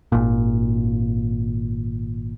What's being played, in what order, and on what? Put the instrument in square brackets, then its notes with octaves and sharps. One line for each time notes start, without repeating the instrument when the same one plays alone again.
[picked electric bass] G#1 A#2